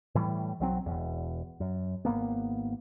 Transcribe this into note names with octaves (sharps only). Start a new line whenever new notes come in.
A2 E3 G3
B1 F#3 C4
E1 E2
F#2
G#1 A#3 B3